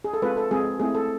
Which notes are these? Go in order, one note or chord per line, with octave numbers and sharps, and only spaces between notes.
G#4
A4
G#3 C4 F4 B4
A4
G#3 C4 F4 G#4
A3 C4 E4 G#4
A4